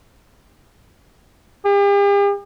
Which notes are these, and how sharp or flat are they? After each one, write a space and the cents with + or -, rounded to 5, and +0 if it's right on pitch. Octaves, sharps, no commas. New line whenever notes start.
G4 +45